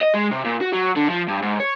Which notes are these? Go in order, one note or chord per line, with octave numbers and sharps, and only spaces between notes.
D#5
G#3
C3
A#2
F#4
F#3
D3
F3
G2
G#2
C#5